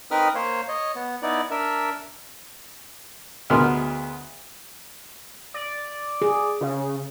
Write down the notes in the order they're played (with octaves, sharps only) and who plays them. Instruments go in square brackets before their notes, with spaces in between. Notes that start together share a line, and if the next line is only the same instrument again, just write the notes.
[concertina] C4 D#4 A#4 B4 D#6 F6
A#3 C5 C#5
C#5 D#5
B3
B3 D#4 E4 D5
D4 A#4 E5
[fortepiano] D2 G#3 B3 A#4 C6 F6
[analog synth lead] D5
[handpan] G#4
[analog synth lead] C#3